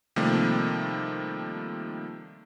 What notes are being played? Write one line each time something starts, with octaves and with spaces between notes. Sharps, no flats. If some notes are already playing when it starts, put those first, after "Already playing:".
C3 D#3 F3 G3 A3 A#3